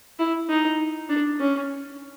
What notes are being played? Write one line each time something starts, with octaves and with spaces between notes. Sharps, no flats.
E4
D#4
D4
C#4